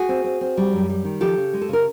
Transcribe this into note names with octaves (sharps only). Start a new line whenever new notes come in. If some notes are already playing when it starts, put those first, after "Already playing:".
Already playing: F#4 G#4
C4
C4
C4
G3
F#2
G3
D#3
F3 G4 A4
C#3
G#3
A4
C#3 A#4